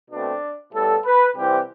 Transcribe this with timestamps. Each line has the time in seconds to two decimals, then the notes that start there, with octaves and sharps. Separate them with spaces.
0.10 B2 A3 C4 D4
0.73 A2 G3 B3 A4
1.05 B4
1.36 C2 C3 E3 G3 C4 G4